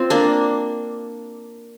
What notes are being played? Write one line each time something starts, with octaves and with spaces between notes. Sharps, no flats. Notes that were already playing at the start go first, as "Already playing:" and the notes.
Already playing: C4 F4
A#3 D4